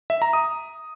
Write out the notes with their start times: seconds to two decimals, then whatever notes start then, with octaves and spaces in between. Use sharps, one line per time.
0.10 E5
0.22 A#5
0.33 D#6